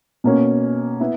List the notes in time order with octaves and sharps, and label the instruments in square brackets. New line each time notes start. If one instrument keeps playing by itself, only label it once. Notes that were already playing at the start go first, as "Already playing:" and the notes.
[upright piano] B2 A#3 C#4
B3 E4